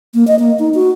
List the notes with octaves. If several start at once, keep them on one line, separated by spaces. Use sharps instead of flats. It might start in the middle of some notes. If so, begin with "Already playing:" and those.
A#3
D#5
A#3
D#4
F#4